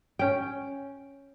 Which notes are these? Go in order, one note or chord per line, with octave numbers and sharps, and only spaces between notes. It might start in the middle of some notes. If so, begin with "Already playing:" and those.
C#4 G5